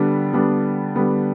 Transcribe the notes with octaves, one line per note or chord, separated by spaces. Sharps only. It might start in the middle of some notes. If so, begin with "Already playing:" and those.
Already playing: D3 G3 B3 D4
D3 G3 B3 D4
D3 G3 B3 D4